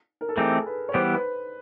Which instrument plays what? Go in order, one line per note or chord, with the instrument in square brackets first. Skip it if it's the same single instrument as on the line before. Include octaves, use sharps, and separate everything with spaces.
[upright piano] A#4
A4
[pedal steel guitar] E3 A3 C4 D#4 G4 [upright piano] G#4
[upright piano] B4
C#5
[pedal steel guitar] E3 G3 B3 E4 G4 [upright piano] C5
[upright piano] B4